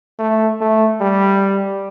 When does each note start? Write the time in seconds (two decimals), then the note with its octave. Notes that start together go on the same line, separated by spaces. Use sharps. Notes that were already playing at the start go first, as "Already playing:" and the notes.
0.19 A3
0.61 A3
1.01 G3